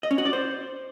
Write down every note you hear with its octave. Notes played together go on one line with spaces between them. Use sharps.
D#5
C#4
F#4
D5
C5